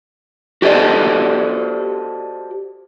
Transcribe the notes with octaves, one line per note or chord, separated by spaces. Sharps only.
F#4 G4 A4 C5 D5 D#5